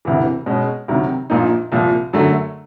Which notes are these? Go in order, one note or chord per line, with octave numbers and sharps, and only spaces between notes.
E1 D2 C3 E3
B2 G#3 C#4
D2 C3 D#3 F#3
A#1 A#2 F3 A#3 D#4
C2 A#2 F3
F#2 D3 F#3 A3